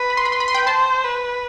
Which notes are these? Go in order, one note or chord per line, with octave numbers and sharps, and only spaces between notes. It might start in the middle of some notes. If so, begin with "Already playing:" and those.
Already playing: B4
B5
C6
B5
B4 C6
B5
C6
G5 B5
C5 A5 C6
B4